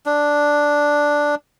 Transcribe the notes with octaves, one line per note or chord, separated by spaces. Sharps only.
D4